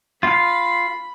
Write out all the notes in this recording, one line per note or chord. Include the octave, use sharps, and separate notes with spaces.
F4 F5 B5